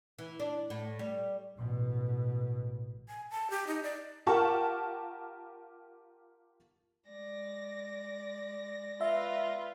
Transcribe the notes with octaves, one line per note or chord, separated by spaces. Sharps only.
E3
D4
A2
G3
A1 B2
G#5
A5
G4
D#4
D5
F4 G4 A#4 F#5 A5 C#6
G#3 D5 A#6
F4 B4 E5